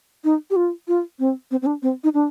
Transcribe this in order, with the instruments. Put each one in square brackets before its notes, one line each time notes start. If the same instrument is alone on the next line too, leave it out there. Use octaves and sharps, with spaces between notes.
[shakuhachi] D#4
G4
F4
F4
C4
C4
C4
D4
C4
D#4
D4